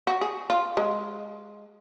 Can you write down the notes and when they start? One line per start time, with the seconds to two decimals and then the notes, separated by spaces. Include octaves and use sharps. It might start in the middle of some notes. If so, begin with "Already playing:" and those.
0.07 F#4
0.21 G#4
0.50 F4
0.77 G#3